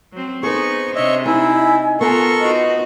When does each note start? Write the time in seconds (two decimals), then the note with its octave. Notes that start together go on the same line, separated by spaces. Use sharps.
0.12 F#3 C4
0.43 B3 D#4 G#4 C5 C#6
0.95 C3 D4 C#5 D#5 E5
1.26 D#4 E4 G#5
2.01 B3 F4 A4 A#4 C#6
2.40 D#4 F4 F#4 D#5